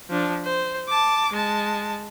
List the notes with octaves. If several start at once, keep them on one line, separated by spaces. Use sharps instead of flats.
F3 D4
C5
A5 D6
G#3 A5